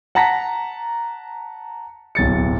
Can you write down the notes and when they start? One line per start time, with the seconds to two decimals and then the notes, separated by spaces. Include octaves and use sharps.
0.15 F#5 A5 A#5 A#6 B6
2.15 D1 B1 A6 C#7